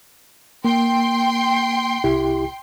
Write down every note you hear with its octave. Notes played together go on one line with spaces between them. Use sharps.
A#3 G5 C6
C2 E4 G4